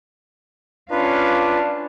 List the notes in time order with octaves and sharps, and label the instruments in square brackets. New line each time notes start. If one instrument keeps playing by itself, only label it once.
[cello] C#4 F5 [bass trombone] D4 [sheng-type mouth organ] F4 B4